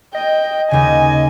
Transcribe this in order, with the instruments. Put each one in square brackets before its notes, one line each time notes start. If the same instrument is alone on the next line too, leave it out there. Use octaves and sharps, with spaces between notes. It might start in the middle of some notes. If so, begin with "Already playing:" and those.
[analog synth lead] D#5 [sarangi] G5
[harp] D#2 C#3 [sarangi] G#5